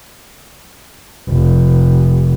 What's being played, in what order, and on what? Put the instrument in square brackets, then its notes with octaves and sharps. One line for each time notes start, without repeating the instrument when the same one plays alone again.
[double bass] F1